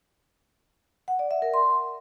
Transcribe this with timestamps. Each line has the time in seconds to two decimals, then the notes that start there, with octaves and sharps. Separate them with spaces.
1.08 F#5
1.19 D5
1.31 E5
1.42 A#4
1.54 C6